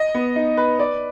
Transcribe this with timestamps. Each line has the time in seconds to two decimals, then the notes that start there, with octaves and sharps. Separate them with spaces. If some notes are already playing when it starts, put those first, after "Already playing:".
Already playing: D#5
0.15 B3
0.36 D#4
0.57 B4
0.79 D5